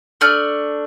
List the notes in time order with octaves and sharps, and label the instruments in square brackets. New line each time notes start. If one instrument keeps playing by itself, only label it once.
[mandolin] A3 D4 F6